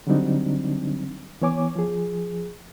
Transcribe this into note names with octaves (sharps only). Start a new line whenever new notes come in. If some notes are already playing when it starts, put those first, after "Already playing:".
D3 F#3 G3 C4 D4 D#4
E3 B3 C#5 G#5 D6
F3 G#4